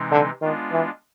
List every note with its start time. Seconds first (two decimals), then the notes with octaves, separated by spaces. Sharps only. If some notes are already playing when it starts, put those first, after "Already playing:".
Already playing: C3 E3 G#3 C4 D#4
0.12 D3
0.42 D#3 G#3 B3 D4 F4
0.72 E3